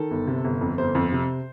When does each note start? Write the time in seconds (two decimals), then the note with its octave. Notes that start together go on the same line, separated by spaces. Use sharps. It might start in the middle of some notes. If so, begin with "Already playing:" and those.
Already playing: D#3 A4
0.11 G1
0.27 C3
0.44 G1
0.61 F2
0.78 G1 C5
0.95 F2
1.12 C3